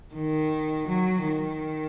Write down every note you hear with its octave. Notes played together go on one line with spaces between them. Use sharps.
D#3
F#3
D#3